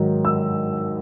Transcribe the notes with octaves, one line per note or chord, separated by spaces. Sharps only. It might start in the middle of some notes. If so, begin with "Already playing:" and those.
Already playing: G#2 D#3 F#3
E6